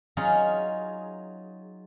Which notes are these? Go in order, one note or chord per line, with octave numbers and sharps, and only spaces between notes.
F#3 C#4 D#4 F4 G#4